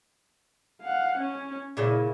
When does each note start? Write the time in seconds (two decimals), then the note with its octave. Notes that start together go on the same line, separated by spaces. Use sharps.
0.81 F5 F#5
1.18 C#4
1.77 A#2 C#3 E4